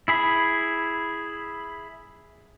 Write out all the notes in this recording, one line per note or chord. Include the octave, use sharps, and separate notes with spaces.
E4 G#4 B5